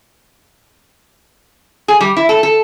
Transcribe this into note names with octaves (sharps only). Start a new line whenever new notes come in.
G#4
G3
E4
A4
A4